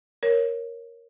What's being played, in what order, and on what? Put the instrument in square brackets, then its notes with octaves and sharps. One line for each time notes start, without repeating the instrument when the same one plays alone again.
[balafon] A#4 C#5